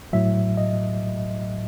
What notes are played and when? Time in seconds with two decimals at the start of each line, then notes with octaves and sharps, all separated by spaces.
0.13 A2 F#3 E5
0.57 D#5